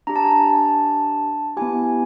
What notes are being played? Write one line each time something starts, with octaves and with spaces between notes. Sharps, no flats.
D4 G4 A#5
A5
G#5
A5
B3 E4 G4 G#5